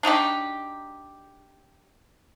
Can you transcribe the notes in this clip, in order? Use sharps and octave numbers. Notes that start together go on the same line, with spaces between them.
D4 D#4 F#4 G4